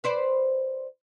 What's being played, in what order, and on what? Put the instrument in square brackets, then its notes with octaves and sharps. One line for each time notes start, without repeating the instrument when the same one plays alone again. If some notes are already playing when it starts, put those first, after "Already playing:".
[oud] B4 C5 D5